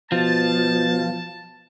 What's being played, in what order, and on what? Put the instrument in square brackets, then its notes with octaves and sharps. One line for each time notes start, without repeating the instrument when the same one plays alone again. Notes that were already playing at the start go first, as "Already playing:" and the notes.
[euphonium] B2 [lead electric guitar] F3 [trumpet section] A5